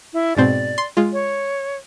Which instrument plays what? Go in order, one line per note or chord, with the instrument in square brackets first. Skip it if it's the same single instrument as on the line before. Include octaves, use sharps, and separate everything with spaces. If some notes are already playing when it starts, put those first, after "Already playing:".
[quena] E4
[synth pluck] G#2 B2 C4 [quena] D5
[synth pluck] C6
G#3 F4
[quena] C#5